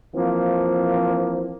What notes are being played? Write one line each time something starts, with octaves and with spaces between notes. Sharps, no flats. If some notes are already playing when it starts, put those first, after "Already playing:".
E3 F3 A#3 C4